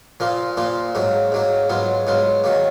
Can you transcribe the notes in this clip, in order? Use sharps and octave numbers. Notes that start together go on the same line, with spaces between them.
A#2 F3 A#3 F4
A#2 F3 A#3 F4
G#2 F#3 A#3
G#2 F#3 A#3
G#2 F#3 B3 F4
G#2 F#3 B3 F4
D#3 F#3 A#3